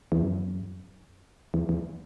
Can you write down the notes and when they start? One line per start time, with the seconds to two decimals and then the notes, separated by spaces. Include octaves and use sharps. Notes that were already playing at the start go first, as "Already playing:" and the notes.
0.12 E2
0.22 F#2
1.54 E2
1.69 E2